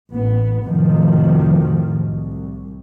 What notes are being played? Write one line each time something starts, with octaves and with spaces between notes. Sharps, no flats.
A1 B3
F2 A2 C3 D#3 F3 F#3
C2